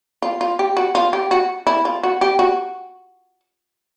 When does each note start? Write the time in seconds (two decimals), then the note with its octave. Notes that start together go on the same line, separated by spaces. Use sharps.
0.22 F4
0.41 F4
0.59 G4
0.77 F#4
0.95 F4
1.13 G4
1.31 F#4
1.67 E4
1.85 F4
2.03 F#4
2.21 G4
2.39 F#4